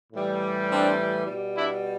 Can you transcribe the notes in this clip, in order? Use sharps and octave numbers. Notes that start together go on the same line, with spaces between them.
A2 E3 G3
C4 D4
B2 G3
D4 E4